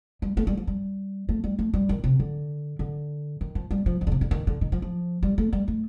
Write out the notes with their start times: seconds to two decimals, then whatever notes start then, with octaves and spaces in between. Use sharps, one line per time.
0.22 G3
0.37 A3
0.47 G3
0.57 F3
0.67 G3
1.29 A3
1.44 G3
1.59 A3
1.74 G3
1.89 D#3
2.04 C3
2.20 D3
2.79 D3
3.41 D#3
3.55 F3
3.71 G3
3.86 F3
4.01 D#3
4.07 D3
4.12 C3
4.21 D3
4.31 D#3
4.47 D3
4.61 D#3
4.72 F3
4.82 F3
5.23 G3
5.38 A3
5.53 G3
5.68 A3